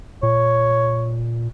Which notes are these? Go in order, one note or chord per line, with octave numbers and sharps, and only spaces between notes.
A#2 C#5